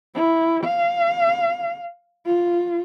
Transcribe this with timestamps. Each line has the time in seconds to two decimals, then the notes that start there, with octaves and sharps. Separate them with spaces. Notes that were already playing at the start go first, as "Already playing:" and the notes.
0.15 E4
0.64 F5
2.26 F4